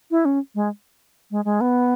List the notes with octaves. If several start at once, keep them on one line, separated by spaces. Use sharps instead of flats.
E4
C#4
G#3
G#3
G#3
B3